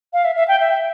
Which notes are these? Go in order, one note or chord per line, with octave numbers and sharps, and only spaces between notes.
F5
E5
E5
G5
E5